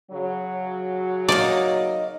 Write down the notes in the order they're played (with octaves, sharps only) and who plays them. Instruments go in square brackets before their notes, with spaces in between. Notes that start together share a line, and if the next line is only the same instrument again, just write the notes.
[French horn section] C#3 F#3
[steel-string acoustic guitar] A#3 D#4 D#5 [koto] D5